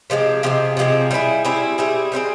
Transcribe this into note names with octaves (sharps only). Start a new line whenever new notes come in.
C3 F3 G#3 C4
C3 F3 G#3 C4
C3 F3 G#3 C4
G3 C4 E4 G#4
G3 C4 E4 G#4
G3 C4 E4 G#4
G3 C4 E4 G#4